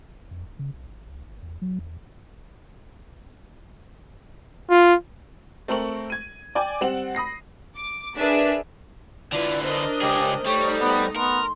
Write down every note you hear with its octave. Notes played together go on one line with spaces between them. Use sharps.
D#1
F2
D1
C#3
B1
G#1
C#2
G#1
E2
F#3
E2
F4
A3 C4 A#4 C#6 F#7
G#6 D#7
D5 G5 G#5 D6
G3 C4 F#5 E7 F#7
B5 D#6 A#6 C7
D6
D4 G#4 A#4 B4 D5 E5
D3 E4 F4 B4 D5
D4 A#4 C5 D#5
C#2 G4 G#4
G3 A3 D#4 C#5
B3
B3 A#4 C6